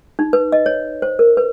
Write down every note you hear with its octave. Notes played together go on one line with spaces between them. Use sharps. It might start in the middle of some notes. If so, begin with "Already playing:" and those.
D#4
B4
D#5
C#5
C5
A#4
B4